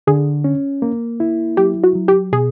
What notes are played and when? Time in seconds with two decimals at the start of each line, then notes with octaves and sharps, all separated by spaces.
0.07 D3 G#4
0.44 C#4
0.82 A#3
1.20 E4
1.57 F#3 G4
1.84 F#4
1.95 F#3
2.08 G4
2.33 B2 G#4